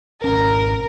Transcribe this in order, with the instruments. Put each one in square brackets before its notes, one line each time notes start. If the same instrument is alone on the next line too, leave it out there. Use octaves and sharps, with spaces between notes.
[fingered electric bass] G#1 C#4 [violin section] A#4